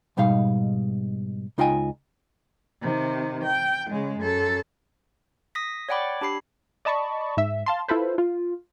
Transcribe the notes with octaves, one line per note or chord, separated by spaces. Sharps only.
G#2 B2 G3 D#4 F5
C#2 D#4 F4 D#5 G5 G#5
C3 D#3
G5
C#3 G#3
F#2 A4
D#6 A#6 B6
C#5 D5 F#5 G5 B5 D6
D4 G4 B5 C7
D5 D#5 A5 B5 C#6
G#2 E5
F5 A5 C6
E4 F4 A4 B4 C5
F4